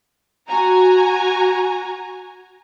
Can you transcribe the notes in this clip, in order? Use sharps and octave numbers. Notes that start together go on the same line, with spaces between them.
F#4 G#5 A#5